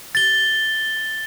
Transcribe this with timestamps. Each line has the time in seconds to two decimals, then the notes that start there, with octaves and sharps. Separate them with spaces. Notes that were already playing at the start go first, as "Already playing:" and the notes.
0.15 A6 G7